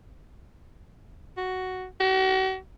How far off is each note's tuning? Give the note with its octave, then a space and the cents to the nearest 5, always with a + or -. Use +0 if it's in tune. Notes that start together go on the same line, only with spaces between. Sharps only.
F#4 +5
F#4 +45